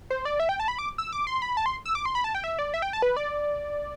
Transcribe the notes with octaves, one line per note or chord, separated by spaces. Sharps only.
C5
D5
E5
G5
A5
B5
D6
E6
D6
C6
B5
A5
C6
E6
D6
C6
B5
A5
G5
E5
D5
E5
G5
A5
B4
D5